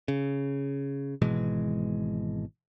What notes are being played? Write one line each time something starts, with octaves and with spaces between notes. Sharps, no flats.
C#3
G#1 B2 E3 G#3